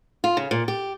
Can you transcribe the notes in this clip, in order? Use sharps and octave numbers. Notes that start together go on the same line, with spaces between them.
F4
C#3
A#2
G4